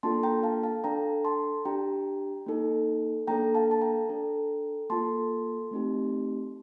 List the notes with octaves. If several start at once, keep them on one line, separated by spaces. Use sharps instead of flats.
A#3 D4 F4 A4 A5 C6
G5 A#5
F5 A5
F5 A5
D4 A4 G5 A#5
A5 C6
D4 G4 G5 A#5
A#3 D#4 A4
A#3 D4 A4 G5 A#5
F5 A5
A5
G5 A#5
D4 A4
A#3 F4 A4 A5 C6
A3 C4 D#4 G4